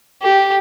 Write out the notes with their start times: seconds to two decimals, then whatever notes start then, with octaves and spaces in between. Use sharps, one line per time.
0.22 G4